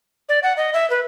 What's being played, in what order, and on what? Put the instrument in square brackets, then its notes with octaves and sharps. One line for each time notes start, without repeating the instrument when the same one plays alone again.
[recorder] D5
F#5
D#5
E5
B4